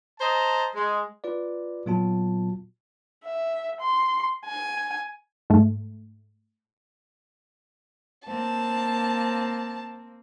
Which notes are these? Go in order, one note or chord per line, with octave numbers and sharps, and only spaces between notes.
C5 D#5 A5 A#5
G#3
F4 B4 D5
A#2 F#3 B3 F4 F#4 A5
E5
C6
G#5
G#2 A3
A#3 C4 A5